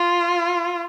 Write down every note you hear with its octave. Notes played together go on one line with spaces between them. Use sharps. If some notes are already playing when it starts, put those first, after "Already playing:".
Already playing: F4